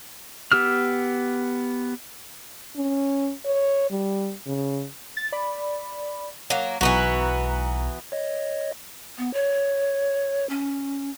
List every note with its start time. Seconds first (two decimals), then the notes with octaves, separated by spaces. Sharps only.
0.52 B3 G4 E6 F6
2.76 C#4
3.45 C#5
3.91 G3
4.47 C#3
5.17 A6
5.32 D5 B5
6.50 F#3 A#3
6.81 B1 E3 B3 F#4 A#5
8.12 C#5 D#5
9.18 B3
9.33 C#5
10.49 C#4